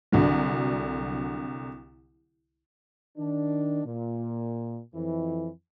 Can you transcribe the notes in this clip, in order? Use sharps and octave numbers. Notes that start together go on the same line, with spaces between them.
C2 D3 F#3
D#3 D4
A#2
F2 E3